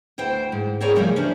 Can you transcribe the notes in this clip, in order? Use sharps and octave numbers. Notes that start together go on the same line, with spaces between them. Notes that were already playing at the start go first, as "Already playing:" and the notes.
D2 E4 C5 G5
G#2
C4 E4 G#4 A#4 C#5 D5
C#3 F3 G3 A3 C#4 A#4
C#4 D4 E4 C5 D5